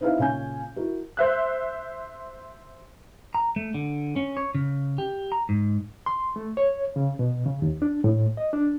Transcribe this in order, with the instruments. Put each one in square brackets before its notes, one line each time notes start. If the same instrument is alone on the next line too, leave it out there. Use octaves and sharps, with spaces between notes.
[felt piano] C4 D#4 E4 B4 E5 F5
A#2 C#3 C#4 G#5 G6
E4 F#4 A#4
[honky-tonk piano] C5 E5 F#6
[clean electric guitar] A#5
A3
D3
C#4
C#5
C#3
G4
A#5
G#2
[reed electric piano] C6
A3
C#5
C#3
B2
C#3
D#2
D4
A2
D#5
D4